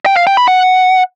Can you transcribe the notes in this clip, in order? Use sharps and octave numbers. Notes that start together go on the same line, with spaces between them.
G5
F5
G5
B5
F#5